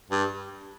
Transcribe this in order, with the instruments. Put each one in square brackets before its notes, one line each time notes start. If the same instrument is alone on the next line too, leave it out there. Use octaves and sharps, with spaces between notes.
[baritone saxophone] G2